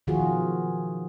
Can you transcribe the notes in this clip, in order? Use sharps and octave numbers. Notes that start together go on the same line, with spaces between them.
B2 D#3 F3 F4 F#4 G#4